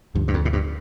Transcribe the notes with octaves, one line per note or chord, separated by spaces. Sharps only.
D2 G2 D3 F3
G2
F2
A2
G2